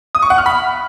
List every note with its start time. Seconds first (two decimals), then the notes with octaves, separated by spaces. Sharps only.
0.15 D#6
0.22 C#6
0.30 F#5
0.38 F6
0.46 B5